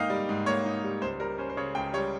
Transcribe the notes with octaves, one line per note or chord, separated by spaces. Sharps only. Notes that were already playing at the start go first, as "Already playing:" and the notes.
Already playing: G#2 A#3 D#4 F5 G5
G3
G#2
A#3 C#5
D#4
G3
C#2 C5
G3 A#4
C#4 C5
C5
C#3 C#5
C#2 G5
G3 C#5